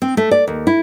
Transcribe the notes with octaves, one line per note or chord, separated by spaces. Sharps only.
C4
A3
D5
D#2
E4